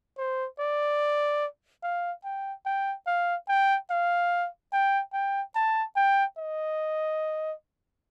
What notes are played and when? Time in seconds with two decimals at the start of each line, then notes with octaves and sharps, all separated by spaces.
0.18 C5
0.59 D5
1.83 F5
2.24 G5
2.66 G5
3.07 F5
3.48 G5
3.90 F5
4.72 G5
5.13 G5
5.55 A5
5.96 G5
6.38 D#5